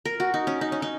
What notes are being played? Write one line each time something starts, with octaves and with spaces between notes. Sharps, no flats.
A#4
F#4
D#4
C#4
D#4
C#4
D#4